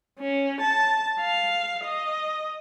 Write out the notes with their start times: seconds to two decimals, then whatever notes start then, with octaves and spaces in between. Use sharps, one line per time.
0.20 C#4
0.60 A5
1.20 F5
1.83 D#5